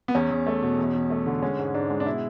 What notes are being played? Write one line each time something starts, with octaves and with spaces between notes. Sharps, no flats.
B3
E2 C#4
E2
A3
B2
E2
E2
A3
D3
G#3 C#4
G#2
G#2 D4
G#3
D4
B2 E4